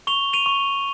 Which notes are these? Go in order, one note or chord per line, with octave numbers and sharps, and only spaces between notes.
C#6 F7 G7
D#7 F7
C#6